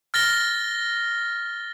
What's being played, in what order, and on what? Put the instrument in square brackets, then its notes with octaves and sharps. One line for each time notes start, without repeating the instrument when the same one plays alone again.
[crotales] F6 A6 A#6 G7